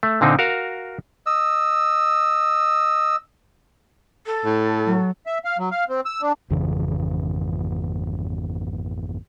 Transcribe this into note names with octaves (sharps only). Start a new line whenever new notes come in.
A3
A#2 D3 C4 D#4
F#4 A#4 F5
D#5 E6
A4
A2
F#3
E5
F5
F#3
F5
C4
E6
D4
G#1 F2 C#3 E3